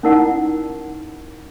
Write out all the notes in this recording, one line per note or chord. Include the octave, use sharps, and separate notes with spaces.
C#4 D#4 E4 A#4 D5 F#5